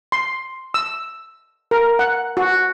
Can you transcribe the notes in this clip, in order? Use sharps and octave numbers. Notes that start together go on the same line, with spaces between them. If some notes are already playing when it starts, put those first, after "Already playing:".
C6
E6
A#4
F#5
F#4